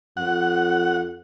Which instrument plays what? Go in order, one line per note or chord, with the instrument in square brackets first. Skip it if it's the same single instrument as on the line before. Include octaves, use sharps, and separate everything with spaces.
[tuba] F2 [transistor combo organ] F#5